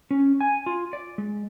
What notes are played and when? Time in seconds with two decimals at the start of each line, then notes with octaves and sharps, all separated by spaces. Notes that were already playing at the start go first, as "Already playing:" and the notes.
0.11 C#4
0.41 G#5
0.66 F4
0.93 D5
1.18 G#3